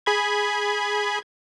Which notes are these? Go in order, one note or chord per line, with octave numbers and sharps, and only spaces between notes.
G#4 B5 G#6